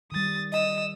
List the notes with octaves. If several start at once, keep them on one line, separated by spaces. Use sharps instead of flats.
D#3 G3 D#6 A6
D#5 D#6 E6